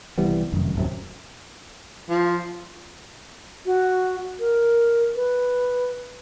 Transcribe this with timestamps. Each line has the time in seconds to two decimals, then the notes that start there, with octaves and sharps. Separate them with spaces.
0.18 C2 E3 G3 B3
0.52 F1 F#2 D#3
0.75 D#1 F#2 C3
2.09 F3
3.66 F#4
4.39 A#4
5.15 B4